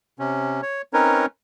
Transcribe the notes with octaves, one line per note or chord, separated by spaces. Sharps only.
C3 C#4
C#5
C4 C#4 D#4 A#4 B4 C#5